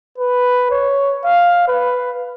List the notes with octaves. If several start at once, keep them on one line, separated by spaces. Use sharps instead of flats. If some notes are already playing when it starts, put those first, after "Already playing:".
B4
C#5
F5
B4